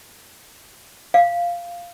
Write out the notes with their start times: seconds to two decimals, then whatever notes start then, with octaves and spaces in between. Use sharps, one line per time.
1.14 F5